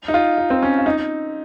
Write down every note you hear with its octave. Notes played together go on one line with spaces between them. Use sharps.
D#4
F4
D#4
C4
C#4
F4
D#4